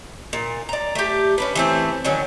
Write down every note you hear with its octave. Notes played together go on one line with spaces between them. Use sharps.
A#2
D5 A#5
A3 G4
C#4 D4 B4
E3 A3 C4
D3 D#3 F#3 C#4